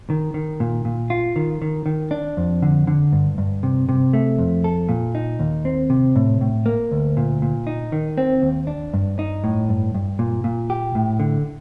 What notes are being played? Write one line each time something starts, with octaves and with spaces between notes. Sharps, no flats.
D#3
D#3
A#2
A#2
F4
D#3
D#3
D#3
D4
F2
D3
D3
G2
G2
C3
C3
A3
F2
A4
A#2
D#4
D#2
C4
C3
A2
A2
A#3
D2
A#2
A#2
D#4
D#3
C4
D#2
D4
G2
D#4
A2
G2
G2
A#2
A#2
G4
A2
D3